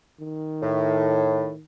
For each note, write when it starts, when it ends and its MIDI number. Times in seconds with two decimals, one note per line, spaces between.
0.20 1.62 51
0.62 1.49 45